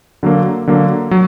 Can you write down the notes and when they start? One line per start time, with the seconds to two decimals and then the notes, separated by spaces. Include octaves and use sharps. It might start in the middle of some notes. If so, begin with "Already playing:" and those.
0.23 D3 F#3 A#3
0.67 D3 F#3 A#3
1.11 F#3